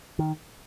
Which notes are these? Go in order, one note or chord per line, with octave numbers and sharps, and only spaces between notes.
D#3